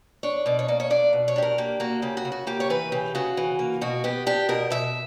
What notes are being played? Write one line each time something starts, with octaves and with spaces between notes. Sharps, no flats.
D4 C#5
B2 D5
C#5
A#3 D5
C#5
D4 D5
B2
C#5
D4 G4
A#4
A#3 G4
A#3 F#4
C#3 G4
F#4
C#3
F#4
A#3 G4
C#5
E3 B4
C#3 G4
C#3 F#4
E3
A#3
B2 F#4
B3 G4
D4 G4
B2 A#4
B2 E5